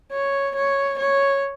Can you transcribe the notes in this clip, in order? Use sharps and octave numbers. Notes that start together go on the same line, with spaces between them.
C#5
C#5
C#5